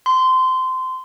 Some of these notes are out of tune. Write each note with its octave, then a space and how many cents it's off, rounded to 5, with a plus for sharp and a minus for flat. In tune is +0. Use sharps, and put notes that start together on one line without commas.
C6 -20